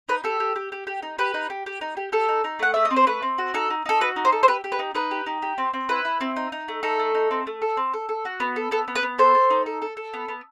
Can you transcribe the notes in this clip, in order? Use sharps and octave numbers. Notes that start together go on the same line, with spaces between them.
D#4 B4
G4 A4
G4
G4
G4
G4
D#4
G4 B4
D#4
G4
G4
D#4
G4
G4 A4
D#4
D#4
A3 F#5
A3 E5
D#5
C4
C5
A3 B4
C4
F#4
D#4 A4
D#4
D#4 A4
F#4 B4
D#4
C5
A4
C5
G4 B4
G4
B4
D#4
D#4 B4
G4
D#4
G4
C4
C4
E4 B4
E4
C4
D#4
D#4
A3
D#4 A4
A3
D#4
C4
A3
A4
C4
A4
A4
F#4
B3
A4
B3 A4
B3
B4
B3
A4 C5
A4
D#4
A4
A4
A4
B3
B3